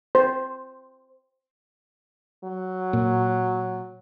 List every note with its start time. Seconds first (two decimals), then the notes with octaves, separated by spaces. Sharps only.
0.15 C5
2.44 F#3
2.93 A#2